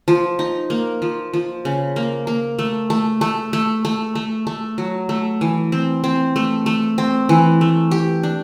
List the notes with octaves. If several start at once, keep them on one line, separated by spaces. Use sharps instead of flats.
F3
D#4
A#3
F3
F3
C#3
A#3
A#3
A3
A3
A3
A3
A3
A3
A3
F#3
A3
E3
C4
C4
A3
A3
C4
E3
A3
G4
D4